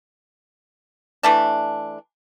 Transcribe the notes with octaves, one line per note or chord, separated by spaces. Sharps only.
E3 A3 D4